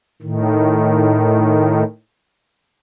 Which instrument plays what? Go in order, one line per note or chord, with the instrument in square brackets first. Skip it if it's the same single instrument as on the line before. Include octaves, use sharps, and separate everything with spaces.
[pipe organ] A2 D#3